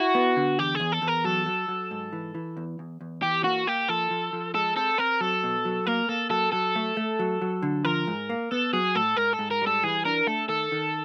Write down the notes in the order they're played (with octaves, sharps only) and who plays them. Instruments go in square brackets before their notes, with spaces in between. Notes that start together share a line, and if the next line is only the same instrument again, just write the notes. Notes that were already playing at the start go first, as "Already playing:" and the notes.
Already playing: [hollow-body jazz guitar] E4 [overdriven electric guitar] F#4
[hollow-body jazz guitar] B3
D3
[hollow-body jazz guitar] E2 [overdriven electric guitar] G4
[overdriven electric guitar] G#4
[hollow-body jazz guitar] E2
[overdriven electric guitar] A4
[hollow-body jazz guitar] E2
[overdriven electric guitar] A#4
[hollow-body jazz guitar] F#3 [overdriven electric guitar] A4
[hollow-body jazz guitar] F#3
F#3
G#2
E3
E3
E2
E2
E2
[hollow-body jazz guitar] E3 [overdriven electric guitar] G4
[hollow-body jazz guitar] A#3 [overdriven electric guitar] F#4
[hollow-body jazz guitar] A#3 [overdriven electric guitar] G4
[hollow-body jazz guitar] F3 [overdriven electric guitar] A4
[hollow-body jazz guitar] F3
F3
[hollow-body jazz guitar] G#3 [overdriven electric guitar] A4
[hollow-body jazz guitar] C4 [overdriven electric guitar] A4
[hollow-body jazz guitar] C4 [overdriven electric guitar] A#4
[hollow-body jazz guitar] F#3 [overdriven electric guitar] A4
[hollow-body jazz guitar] B2
F#3
[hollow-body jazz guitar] A#3 [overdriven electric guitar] A#4
[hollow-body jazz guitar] A#3 [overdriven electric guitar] A4
[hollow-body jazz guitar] F#3 [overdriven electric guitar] A4
[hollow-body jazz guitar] F#3 [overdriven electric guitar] A4
[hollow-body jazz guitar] A3
A3
F#3
F#3
D3
[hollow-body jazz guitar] F3 [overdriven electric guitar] A#4
[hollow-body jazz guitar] G#2
A#3
[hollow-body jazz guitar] B3 [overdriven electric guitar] A4
[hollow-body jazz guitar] F#3 [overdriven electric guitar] G#4
[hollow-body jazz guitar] A2 [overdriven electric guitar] A4
[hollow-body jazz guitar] G#2 [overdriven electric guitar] A#4
[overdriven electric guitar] A4
[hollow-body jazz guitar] G#2
[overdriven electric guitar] A#4
[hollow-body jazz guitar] G3 [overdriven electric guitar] A4
[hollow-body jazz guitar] E3 [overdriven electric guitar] G#4
[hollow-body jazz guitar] D4 [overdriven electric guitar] A#4
[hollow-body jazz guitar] A3 [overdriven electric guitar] A4
[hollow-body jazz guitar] D#3 [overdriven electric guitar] A4
[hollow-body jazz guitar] D#3